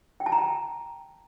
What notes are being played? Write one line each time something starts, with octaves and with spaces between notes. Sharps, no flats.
G5
A5
A#5
G5